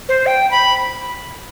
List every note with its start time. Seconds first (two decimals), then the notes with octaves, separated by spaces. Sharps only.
0.09 C5
0.26 G5
0.51 B5